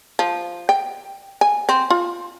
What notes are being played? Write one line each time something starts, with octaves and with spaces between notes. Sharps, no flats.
F3
G5
G#5
C4
F4